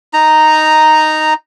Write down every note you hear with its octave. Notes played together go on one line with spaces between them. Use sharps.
D#4 A#5